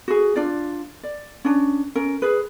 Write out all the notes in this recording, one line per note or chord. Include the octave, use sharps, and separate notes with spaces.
F#4 G#4
D4 F4 D5
D5
C#4 D4
C#4 A#4
G#4 B4